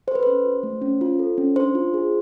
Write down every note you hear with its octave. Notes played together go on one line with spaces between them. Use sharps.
A4 C5
B4
C#4 C5
F#4
A3
C#4
F4
A4
C#4
D4 C5
F4
G#4